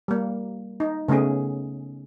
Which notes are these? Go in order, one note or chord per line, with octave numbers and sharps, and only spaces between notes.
G3 A#3
D#4
C#3 A3 B3 C#4 G#4